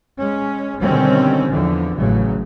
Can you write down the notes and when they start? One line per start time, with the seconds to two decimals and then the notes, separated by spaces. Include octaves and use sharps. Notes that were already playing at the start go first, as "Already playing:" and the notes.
0.19 G#3 C#4
0.81 B2 D3 D#3 G3 C4 C#4
1.51 E2 D3 E3 F3
1.97 A1 C#3 F#3